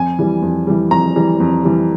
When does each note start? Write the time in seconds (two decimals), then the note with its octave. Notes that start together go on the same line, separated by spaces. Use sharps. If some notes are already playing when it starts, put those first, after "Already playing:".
Already playing: F2 G#5
0.19 E3 G3
0.42 F2
0.67 E3 G3
0.91 F2 A#5
1.16 E3 G3
1.40 F2
1.65 E3 G3